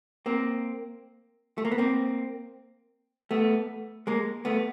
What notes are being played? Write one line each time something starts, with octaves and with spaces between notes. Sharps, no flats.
A#3 C4
A3
A#3
B3
A#3 C4
A3 B3
G#3 A#3
A3 B3